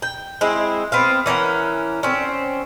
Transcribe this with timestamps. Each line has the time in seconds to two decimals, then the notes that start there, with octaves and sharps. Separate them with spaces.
0.02 G5
0.41 G#3 C4 E4
0.92 B3 C4 F5
1.26 E3 C#4 A#4 F#5
2.03 D3 C4 C#4